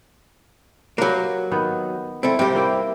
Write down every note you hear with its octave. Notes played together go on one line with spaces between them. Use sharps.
F#3 A#3 G4 A#4 B4
D#3 B3
A3 C4 E4
C3 G3 A#3 C4 G4
A#3 E4 G5